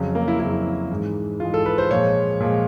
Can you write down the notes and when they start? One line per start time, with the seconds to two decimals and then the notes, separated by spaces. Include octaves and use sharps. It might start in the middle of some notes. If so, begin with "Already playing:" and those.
Already playing: F2 C#3 F#3
0.15 A#3
0.28 E4
0.40 F2 C#3 F#3 E4
0.90 G#2 E3 G#3
1.40 G#2 E3 G#3 F4
1.54 A4
1.66 B4
1.78 C5
1.91 A#2 F3 G#3 C#5
2.40 A#2 F3 G#3